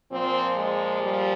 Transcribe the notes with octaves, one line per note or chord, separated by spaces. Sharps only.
A#2 F3 C4
G#3
G3